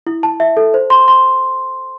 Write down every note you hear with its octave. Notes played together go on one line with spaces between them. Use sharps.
E4
A5
E5
A4
C5
C6
C6